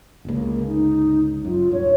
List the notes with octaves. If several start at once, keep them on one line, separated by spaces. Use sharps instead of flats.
G1 C#2 A#3
D#4
F#2 F4
D#1 G2 C#5